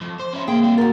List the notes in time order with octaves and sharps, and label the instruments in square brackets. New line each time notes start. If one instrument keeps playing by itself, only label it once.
[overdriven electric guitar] F2
C5
C#4 E4
[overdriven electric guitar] C#2 G5 [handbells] A#3 [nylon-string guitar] G#4
[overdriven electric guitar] G3 C4
[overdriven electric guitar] D2 [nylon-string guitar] F#4 A#4 [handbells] A6